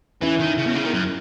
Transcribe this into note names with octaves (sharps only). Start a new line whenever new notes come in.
E3 C#4 E4
D#3
C#3
B2
C#3
D#3
F#2